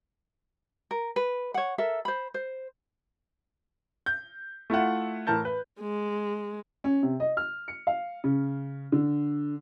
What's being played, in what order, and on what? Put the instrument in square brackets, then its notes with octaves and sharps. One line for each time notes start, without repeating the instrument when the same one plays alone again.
[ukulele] A#4
B4
C#5 F#5
A4 A#4 E5
C5 B5
C5
[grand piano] G6
A3 E4 F4 F#5
A2 E3 A#4 A5 G6
B4
[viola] G#3
[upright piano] C#4
C3
D#5
F6
C#7
F5
C#3
D3